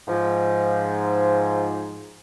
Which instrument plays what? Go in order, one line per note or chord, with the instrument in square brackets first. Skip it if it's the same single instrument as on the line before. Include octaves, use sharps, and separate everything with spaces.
[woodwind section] G#2 F3